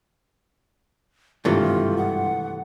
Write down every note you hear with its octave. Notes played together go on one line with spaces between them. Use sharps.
G#1 G2 C3 E3 A3 F4
F#5